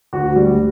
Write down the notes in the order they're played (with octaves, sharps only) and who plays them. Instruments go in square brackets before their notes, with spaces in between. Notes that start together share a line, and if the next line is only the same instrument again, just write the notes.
[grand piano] D2 F#4
D2 G3